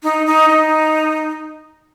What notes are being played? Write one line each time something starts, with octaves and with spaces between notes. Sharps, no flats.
D#4
D#4
D#4